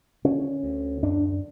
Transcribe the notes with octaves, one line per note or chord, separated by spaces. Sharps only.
D3 C#4
D2
F#2 D4